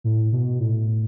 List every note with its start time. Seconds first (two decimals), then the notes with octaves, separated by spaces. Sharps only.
0.04 A2
0.32 B2
0.60 A2